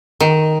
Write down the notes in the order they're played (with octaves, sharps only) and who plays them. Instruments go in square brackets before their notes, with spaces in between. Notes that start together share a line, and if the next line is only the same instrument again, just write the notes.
[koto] D#3